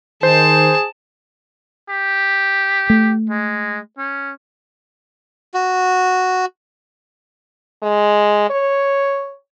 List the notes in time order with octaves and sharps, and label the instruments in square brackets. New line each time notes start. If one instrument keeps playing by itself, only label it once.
[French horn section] D#3 [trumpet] G#4 [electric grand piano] C5 [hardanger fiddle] A5
[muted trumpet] G4
[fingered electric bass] A3
[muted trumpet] G#3
C#4
[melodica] F#4
[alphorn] G#3
C#5